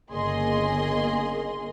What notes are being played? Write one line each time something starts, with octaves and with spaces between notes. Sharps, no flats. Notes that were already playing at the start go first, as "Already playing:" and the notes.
G1 C#3 A#3 G#4 D#5 C6